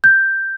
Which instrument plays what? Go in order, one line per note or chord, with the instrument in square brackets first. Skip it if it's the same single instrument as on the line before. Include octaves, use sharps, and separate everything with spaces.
[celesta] G6